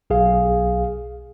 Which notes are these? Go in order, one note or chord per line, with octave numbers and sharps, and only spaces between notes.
B1 G#4 F5